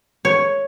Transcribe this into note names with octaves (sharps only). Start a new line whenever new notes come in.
C#5